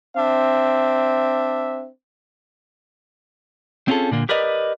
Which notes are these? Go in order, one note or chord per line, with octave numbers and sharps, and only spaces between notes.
C4 D4 E5
C4 C#4 F4 G#4 A4
A#2 D3 A#3
G4 A#4 B4 D5 D#5